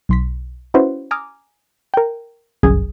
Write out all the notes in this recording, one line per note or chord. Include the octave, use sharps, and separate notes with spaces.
B1 C6 B6
C#4 E4 F#4 B4 C5
G#5 A#5 D6 D#6 F6
A#4 G5
G1 C2 F#2 G#4 D#6 G#6